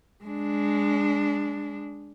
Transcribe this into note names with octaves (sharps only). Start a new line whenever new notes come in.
G#3 D4